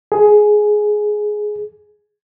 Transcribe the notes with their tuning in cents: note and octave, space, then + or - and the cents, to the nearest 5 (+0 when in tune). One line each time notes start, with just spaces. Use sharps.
G#4 +10